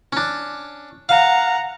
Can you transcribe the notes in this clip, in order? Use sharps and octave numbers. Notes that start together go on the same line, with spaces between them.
C#4 D4
F5 F#5 A#5